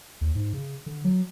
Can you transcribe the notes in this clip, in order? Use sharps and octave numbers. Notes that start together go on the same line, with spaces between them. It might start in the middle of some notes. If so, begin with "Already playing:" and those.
D#2
G#2
C#3
D3
F#3